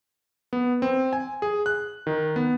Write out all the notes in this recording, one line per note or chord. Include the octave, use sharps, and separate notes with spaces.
B3
C4
G#5
G#4
F#6
D#3
B3